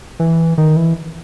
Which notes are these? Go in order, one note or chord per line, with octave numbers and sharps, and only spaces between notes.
E3
D#3
E3